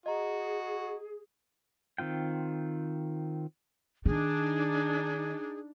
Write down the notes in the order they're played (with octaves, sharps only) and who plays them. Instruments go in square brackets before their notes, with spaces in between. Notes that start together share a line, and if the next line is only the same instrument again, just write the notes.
[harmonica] F#4 [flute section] G#4 [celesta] D#5 A#5
[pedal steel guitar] D#3 C4 F4 G5
[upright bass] D#3 [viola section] D4 D#4 [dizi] G#4